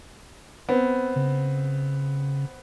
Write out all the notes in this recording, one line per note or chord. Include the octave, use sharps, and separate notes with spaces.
B3 C4
C#3